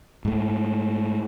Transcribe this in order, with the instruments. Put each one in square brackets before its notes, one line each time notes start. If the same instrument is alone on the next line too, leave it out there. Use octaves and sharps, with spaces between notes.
[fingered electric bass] G#2 A3